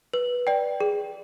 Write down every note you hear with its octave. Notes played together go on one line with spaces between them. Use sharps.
B4
D5 G5
G#4